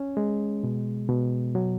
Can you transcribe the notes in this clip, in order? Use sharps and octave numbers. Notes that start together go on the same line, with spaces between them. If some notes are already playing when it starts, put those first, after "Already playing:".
Already playing: C#4
G#3
B2
B2
F#3